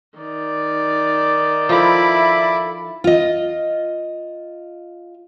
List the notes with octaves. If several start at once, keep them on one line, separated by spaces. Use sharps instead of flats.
D#3 D5
F3 E4 A4 E5 B5 D6
F4 D#5